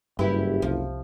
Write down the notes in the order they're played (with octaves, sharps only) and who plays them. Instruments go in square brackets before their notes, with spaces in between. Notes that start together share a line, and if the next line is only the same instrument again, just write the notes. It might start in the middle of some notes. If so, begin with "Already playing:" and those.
[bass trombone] F#1 [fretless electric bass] G2 [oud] E4 G4 B4
[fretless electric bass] C2 [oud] F3